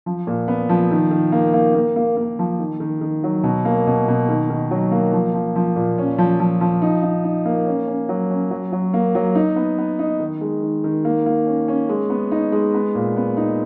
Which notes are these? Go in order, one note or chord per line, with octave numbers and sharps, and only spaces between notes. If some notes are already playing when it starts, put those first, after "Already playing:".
F3
A#2
B3
F3
D#3
D#3
A#3
A#3
A#3
A#3
A#3
F3
D#3
D#3
D#3
F#3
B2
A#3
B2
B2
D#3
D#3
F#3
A#3
F3
F3
F3
A#2
C#4
F3
F3
F3
D#4
D#4
D#4
A#3
C#4
C#4
F#3
C#4
F#3
F#3
A#3
F#3
D#4
B3
B3
D#4
D#3
G#3
D#3
D#3
A#3
A#3
C#4
C#4
G#3
B3
D#4
G#3
B3
A#2
B3
D#4